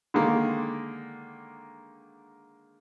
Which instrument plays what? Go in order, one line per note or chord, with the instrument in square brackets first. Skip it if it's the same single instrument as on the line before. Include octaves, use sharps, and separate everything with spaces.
[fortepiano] D3 D#3 G#3 A#3